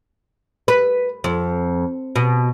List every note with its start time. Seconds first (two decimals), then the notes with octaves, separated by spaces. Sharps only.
0.68 B4
1.24 F2
2.16 B2